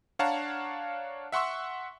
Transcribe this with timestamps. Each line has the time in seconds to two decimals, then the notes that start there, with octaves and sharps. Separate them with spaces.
0.19 D4 C#5 F5 F#5 A5 A#5
1.32 E5 F#5 C6 C#6 E6